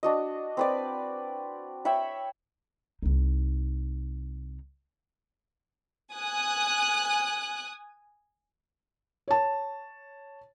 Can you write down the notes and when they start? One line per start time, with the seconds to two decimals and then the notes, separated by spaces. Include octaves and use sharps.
0.03 D4 F#4 D#5
0.57 C4 B4 D5
1.85 C#5 E5 G5 B5
3.03 C2 D#4
6.13 G#5 D#6 F#6
9.28 C#5 A5